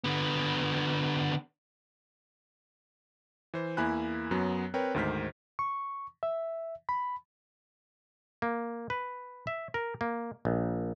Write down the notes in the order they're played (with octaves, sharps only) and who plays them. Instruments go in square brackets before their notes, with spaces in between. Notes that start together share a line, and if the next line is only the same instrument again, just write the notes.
[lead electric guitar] D3 B3
[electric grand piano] E3 C5
E2 A#3 E4 G#5 B5 F#6
F#2 F#3 B3
C4 A#4 B4 C#5 G5
D2 G#2 D#3 C5 F6 B6
[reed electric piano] C#6
E5
B5
[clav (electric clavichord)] A#3
B4
E5
A#4
A#3
A#1